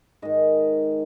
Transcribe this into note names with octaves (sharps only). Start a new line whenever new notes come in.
G#2 D#3 D#5